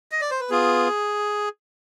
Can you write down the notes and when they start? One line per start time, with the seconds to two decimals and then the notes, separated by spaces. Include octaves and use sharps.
0.12 D#5
0.21 D5
0.31 C5
0.40 B4
0.50 B3 F4 G#4